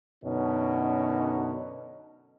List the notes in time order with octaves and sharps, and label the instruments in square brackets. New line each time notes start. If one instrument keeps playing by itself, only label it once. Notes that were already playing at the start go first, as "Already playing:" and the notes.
[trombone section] F#2 B2 D3 C#4 D#4